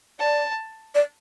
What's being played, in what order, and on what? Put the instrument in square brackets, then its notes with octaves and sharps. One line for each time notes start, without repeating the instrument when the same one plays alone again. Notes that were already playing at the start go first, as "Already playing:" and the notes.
[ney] D5 [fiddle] A5
[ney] D5